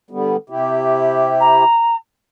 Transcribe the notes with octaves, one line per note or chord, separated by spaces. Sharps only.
D3 G3 B3
C3 E4 G4
A#5